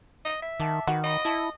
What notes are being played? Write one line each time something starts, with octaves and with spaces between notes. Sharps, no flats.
D#5
E5
D#3 F#5 A5 D6
D#3 F#4 B4
D#4 D#5 B5 C#6
E4 A5 C#6